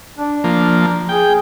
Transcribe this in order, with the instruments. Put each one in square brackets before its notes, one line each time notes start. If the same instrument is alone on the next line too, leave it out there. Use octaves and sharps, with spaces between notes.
[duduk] D4
[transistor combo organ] F3 A#3
[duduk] G#4 [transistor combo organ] G5